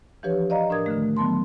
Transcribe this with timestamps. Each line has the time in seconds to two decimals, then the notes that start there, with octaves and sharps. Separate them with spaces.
0.23 E3 F3 D4 G4 B4 C#5
0.50 D5 D#5 F5 A#5
0.70 A2 D4 A#4 D#6 G#6
0.86 D3 D#3 A3
1.17 D#3 F#3 B3 A5 C6